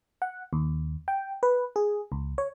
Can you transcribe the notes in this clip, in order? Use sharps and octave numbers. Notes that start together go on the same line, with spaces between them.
F#5
D#2
G5
B4
G#4
C#2
C#5